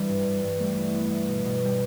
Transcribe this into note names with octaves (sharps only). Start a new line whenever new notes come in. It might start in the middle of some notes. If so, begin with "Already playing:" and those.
Already playing: E3 G3 D4
G2
G2
G2
G3 A3
E4
B3
B3
B2
B2
G3